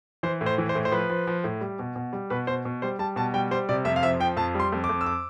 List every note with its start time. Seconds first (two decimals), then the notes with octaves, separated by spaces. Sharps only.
0.23 E3 C5
0.41 A2
0.46 C5
0.58 E3
0.69 C5
0.75 A2
0.85 C5
0.92 F3 B4
1.10 F3
1.27 F3
1.44 A2
1.61 G3
1.79 B2
1.96 B2
2.13 G3
2.30 B2 B4
2.47 B2 C5
2.65 B2
2.82 G3 C5
2.99 G3 A5
3.16 B2 A5
3.34 G3 G5
3.51 G3 C5
3.69 C3 D5
3.85 F2 E5
3.96 F5
4.03 F3 E5
4.20 F3 G5
4.37 F2 A5
4.54 G3
4.60 C6
4.72 F2
4.84 D6
4.89 F2
5.01 E6
5.06 D6